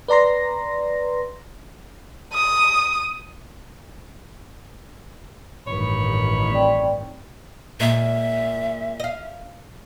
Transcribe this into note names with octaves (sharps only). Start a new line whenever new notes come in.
B4 D5 A#5 C6 A#6
D#6
A1 G2 D#3 C#5 B5
C4 D5 G5
A#2 G#3 E5
D#5 F5